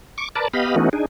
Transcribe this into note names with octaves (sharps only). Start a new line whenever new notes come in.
C#6 D6
A#4 B4 D5 A5
B3 G4 D#5 F5 B5
E3 A3 B3 C#4 D#4 F#4
D4 D#4 G#4